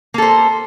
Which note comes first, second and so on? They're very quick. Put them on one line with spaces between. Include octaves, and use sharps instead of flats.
A#3 A4 C5